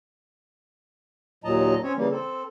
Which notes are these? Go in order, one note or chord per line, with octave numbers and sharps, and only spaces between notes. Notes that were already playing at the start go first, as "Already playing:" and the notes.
D#2 A#2 F#3 D#5 A5 A#5
C4 C#4 C#5
C#3 E3 G3 A#3
C4 A4